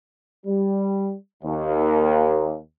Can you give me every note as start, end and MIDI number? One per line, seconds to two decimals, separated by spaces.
0.46 1.13 55
1.43 2.57 39